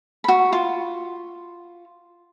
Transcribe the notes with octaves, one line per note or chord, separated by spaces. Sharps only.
F#4 B5
F4